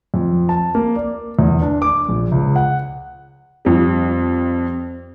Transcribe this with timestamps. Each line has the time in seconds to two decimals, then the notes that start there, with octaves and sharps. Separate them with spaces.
0.14 F2
0.49 A5
0.75 A#3
0.96 D5
1.39 E2
1.61 D4
1.82 D6
2.09 A#1
2.32 C#2
2.56 F#5
3.65 F2 G3